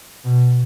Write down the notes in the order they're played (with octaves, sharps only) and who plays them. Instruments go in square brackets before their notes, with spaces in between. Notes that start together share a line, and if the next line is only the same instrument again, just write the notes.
[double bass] B2